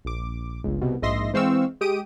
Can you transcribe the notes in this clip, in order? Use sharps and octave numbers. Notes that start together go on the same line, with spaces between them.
A#1 D6
G1 C#2
C2 B2
A#1 G#2 D#5 E5 C6 A#6
E3 G#3 C4 F5 C#6 E6
G#3 G4 D#6 D7 D#7